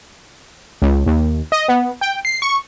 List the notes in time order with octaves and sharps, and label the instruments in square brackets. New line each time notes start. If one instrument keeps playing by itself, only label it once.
[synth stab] C#2
D#2
D#5
B3
G5
C7
C#6